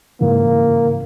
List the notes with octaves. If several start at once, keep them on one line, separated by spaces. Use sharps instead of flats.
G#2 C#3 E3 A#3